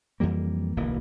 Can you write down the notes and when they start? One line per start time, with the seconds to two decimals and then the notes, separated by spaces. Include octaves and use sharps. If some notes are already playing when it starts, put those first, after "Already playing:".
0.20 F2 E3 G3 A#3
0.77 D1 B1 E3 A#3